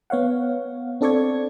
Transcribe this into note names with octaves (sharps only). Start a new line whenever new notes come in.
B3 C#5 F5 F#5
C4 D4 A4 D5 C#6 G#6